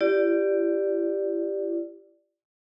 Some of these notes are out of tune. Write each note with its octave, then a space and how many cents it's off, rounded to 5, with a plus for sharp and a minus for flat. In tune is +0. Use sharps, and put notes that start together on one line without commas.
E4 +45 G4 +0 D5 +0